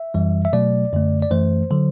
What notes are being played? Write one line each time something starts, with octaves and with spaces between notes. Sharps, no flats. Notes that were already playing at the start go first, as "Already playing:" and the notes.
Already playing: E5
F#2 E3 G3
E5
B2 F#3 A3 D5
F#2 D3 A3
D5
F#2 E3 A3 C5
D3 F#3